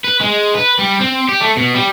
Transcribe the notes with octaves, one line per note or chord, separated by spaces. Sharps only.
B4
G#3
B4
G3
C4
G4
A3
B2
G3